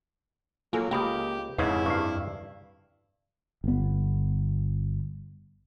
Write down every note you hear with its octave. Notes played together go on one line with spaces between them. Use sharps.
F#3 A#3 F4 A4 G#5
C#2 A#3 G4 G5 B5 D#6
F2 G#2 C#3 C#4 E4 B4 C7
G2 G4 F5 C#6
G1 B3